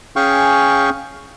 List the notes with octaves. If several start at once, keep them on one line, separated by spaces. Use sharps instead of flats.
C#4 G#4 F5 G5 C#6